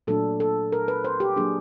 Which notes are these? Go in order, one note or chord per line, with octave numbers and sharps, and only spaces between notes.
A#2 F#3 A3 D4 A4
A4
A#4
B4
C5
G4
F#3 A#3 D4 G#4